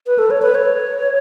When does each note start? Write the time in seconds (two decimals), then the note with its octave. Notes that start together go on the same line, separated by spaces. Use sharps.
0.07 B4
0.19 A4
0.31 C#5
0.42 B4
0.55 C#5